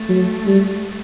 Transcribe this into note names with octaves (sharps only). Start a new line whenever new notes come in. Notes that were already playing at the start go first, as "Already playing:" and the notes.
Already playing: A3
F#3
G3